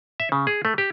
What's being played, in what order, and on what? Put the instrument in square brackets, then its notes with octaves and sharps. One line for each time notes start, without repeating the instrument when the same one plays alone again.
[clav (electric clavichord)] E5
C#3
G#4
A3
G4